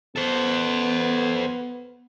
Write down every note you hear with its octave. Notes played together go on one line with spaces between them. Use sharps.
B3 A4 C5